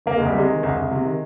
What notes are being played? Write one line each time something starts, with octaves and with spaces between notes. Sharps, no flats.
C2 A#3
C2 G#3
G3
C3 G#3
D#3
C2
C2
C3
D#3